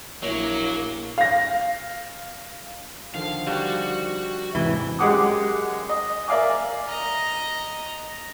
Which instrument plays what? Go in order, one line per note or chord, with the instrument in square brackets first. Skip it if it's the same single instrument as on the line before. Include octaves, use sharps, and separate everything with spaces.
[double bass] A#1 [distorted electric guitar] F#3 [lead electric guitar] A#3 [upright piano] E4 C#5
[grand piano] F5 A#6
[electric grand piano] D3 D#3 F3 [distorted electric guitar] F5
[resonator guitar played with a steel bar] G3 [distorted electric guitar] F#4
[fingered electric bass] E2 G#2 C3 [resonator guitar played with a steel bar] E3
[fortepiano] F#2 G#3 G4 F#5 D6 D#6
D#5
A#4 D5 E5 F5 G#5 D6
[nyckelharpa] D#5 A#5